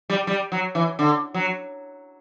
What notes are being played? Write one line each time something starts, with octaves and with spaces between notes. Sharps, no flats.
G3
G3
F#3
E3
D3
F#3